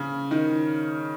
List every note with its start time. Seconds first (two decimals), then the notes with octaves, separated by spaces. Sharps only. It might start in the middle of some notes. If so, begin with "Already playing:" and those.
Already playing: C#3
0.31 D#3